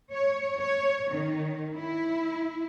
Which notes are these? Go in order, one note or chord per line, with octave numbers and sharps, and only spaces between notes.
C#5
C#5
D#3
E4